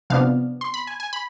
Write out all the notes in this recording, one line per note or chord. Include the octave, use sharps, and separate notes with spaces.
C3 F3 B3 D4 F5
C6
B5
G#5
G#5
B5